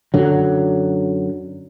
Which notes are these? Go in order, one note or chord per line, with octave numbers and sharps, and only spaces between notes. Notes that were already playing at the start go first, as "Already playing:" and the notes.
F#2 D3 F#3